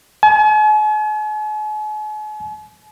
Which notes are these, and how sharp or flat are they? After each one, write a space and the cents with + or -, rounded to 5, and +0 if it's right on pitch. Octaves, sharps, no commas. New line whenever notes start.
G#5 +45